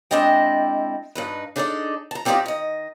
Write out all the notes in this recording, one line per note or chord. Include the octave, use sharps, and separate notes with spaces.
G#3 C4 D4 E4 D#5 G5
G2 D#4 B4
D4 D#4 G#4 A4 C#5 D5
A5 A#5
G3 C4 D#4 F4 G4 D5
D#3 D#5